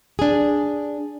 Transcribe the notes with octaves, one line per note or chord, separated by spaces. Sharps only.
D4 G#4